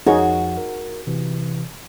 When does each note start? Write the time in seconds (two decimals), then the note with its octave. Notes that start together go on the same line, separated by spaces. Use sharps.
0.07 F2 F3 D#4 F#4 G#4 C#5 F#5
0.57 A#4
1.07 C3 E3